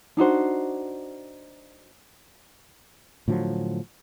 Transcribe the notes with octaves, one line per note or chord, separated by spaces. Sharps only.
D4 D#4 F#4 C5
A2 D3 F3 F#3